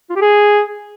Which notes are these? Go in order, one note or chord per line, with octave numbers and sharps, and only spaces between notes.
F4
G4
G#4